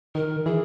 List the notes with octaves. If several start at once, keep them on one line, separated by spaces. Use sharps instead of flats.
D#3 A#4
E3 G#4